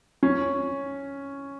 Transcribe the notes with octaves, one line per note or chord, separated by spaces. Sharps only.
C#4